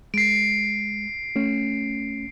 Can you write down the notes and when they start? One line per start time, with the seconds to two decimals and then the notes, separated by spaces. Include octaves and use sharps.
0.14 G#3 C7 D7
1.36 A3 C#4